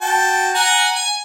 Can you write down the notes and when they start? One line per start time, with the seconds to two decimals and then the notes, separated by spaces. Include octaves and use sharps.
0.02 F#4 G5 A5
0.54 F#5 G#5 A#5
0.96 G#5